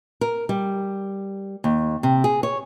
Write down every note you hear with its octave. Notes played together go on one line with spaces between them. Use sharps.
A#4
G3
D#2
C3
G#4
C#5